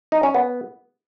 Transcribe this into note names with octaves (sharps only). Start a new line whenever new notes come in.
D#4
C#4
B3